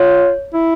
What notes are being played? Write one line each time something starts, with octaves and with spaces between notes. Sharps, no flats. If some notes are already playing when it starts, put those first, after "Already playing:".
Already playing: F4 C#5
E4